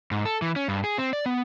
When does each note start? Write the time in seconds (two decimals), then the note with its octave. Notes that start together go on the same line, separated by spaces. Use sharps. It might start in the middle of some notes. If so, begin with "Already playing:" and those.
0.11 G#2
0.26 A4
0.42 E3
0.56 C#4
0.68 G2
0.84 G#4
0.98 C4
1.13 D5
1.26 B3